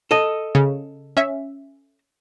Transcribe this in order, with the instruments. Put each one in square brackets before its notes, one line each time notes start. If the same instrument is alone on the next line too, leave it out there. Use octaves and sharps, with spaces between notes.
[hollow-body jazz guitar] A4 D#5
[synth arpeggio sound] C#3
C#4 E5